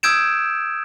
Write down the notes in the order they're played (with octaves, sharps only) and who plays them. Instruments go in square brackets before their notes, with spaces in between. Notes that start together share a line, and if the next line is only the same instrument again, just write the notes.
[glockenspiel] D#6 E6 G6 G#6 D7 E7